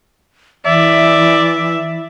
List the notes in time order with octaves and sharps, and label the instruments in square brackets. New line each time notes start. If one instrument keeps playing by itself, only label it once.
[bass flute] E3 [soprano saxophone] D5 [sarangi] E5